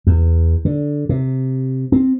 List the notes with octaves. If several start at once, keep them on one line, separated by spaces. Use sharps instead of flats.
E2
D3
C3
C4